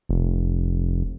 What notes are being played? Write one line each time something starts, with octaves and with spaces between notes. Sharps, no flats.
F1